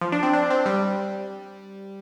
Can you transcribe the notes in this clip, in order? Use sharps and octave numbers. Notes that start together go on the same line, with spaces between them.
F3
D4
C4
D4
C4
G3